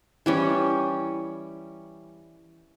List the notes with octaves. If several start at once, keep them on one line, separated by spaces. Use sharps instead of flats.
E3 G3 C#4